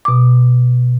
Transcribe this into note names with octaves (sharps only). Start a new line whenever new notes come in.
B2 D6